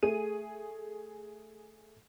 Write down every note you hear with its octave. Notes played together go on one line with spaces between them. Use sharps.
A3 G#4 D#7